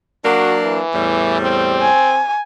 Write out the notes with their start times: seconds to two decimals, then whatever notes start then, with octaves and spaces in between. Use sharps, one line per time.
0.25 F#3 A#3 D4 F#4
0.63 E3
0.94 E2 A2 G3
1.42 C4
1.82 G#5